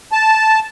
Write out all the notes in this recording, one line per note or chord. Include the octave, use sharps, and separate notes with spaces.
A5